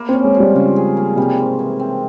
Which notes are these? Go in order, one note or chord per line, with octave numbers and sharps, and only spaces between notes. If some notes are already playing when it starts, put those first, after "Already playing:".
Already playing: A#3 E4
C4
C#4
G#3
F3
G3
C#3 F4
G#4
A#3
C3 G3
G#2
E3
C4